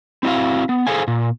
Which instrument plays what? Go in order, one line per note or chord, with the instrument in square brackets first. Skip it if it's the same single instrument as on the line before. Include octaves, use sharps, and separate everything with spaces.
[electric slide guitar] C4 E4 F#4 F5
B3
G#4 A4 B4 C5 F5 G#5
A#2